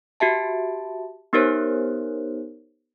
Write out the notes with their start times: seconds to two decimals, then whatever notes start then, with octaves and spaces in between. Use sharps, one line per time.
0.20 F#4 G4 E5 A5
1.33 B3 D#4 G4 A#4 C5 C#5